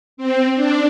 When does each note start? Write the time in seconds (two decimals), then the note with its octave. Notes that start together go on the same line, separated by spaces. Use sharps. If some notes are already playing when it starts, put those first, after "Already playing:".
0.17 C4
0.55 D4